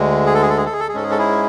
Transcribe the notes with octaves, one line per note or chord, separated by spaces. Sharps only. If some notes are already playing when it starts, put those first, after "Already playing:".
Already playing: D2 D3 G#3
G#4
A4
G#4
A4
G#4
A4
G#4
A4
G#4
G#2 G#3 C#4 A4
G#4
A4
E4 G#4